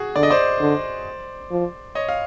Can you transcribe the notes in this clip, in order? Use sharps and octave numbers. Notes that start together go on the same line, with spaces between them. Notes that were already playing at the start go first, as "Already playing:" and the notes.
Already playing: F#4 G#4
D3 D5
D#5
C5 D5
D3
F3
C#5 D#5
F5